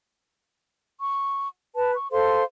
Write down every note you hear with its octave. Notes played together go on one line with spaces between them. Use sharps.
C#6
B4 A5
C#6
A4 C5 F5 C6